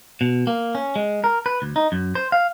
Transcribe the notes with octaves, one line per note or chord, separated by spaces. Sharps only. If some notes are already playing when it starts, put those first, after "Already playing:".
B2
A#3
C#4
G#3
A#4
B4
D2
D#4
F#2
C5
F5